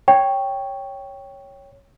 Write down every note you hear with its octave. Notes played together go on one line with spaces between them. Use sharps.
C#5 G5